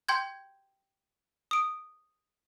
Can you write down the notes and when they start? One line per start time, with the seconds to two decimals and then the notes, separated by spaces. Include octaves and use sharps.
0.08 G5 C6 G6 G#6
1.51 D#6 D7